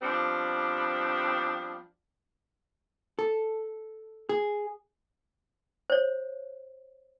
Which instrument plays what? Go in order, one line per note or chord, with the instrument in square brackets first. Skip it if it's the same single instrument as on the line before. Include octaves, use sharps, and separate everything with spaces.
[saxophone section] F3 G3 B3 C4 D4
[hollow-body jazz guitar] A4
G#4
[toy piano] C5 C#5